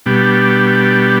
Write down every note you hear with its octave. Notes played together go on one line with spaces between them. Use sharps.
B2 G3 B3 D4 G4